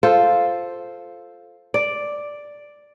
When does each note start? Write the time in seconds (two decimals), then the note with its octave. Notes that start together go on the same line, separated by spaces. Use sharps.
0.03 F4 A4 C5
1.74 D5